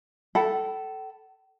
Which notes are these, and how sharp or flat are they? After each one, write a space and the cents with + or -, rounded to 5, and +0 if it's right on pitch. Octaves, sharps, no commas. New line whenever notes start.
A4 +0 G5 -45 B5 +0